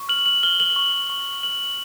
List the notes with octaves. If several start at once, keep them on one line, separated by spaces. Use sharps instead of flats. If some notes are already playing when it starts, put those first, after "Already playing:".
Already playing: C#6
F6 F#7
F#7
F6 G7
F#7
C#6
C#6
F6 F#7